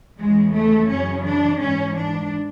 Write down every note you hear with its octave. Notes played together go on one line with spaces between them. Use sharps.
E2 C#3 E3 G#3
A3
F#2 C#3 E3 C#4
D4
G#2 E3 C#4
D4